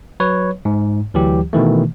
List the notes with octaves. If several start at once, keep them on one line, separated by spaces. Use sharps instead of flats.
F#3 B4 C#5
G#2
D2 E3 F#3 G4
B2 D#3 E3 A3